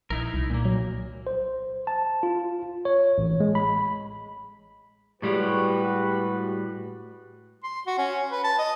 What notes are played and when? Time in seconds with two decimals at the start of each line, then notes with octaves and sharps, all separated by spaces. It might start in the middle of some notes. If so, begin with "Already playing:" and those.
0.10 A#1 D#4 E4 A#4
0.34 C2
0.50 A#2 A#3
0.65 F#3
1.27 C5
1.87 A5
2.23 F4
2.85 C#5
3.18 A1
3.40 G#3
3.55 B5
5.22 A2 G3 G#3 F#4 G4 B4
7.64 C6
7.86 F#4
7.98 C#4
8.31 B4
8.44 A5
8.59 D#5